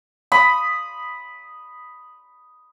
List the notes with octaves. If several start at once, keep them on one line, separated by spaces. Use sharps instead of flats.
B5 D#6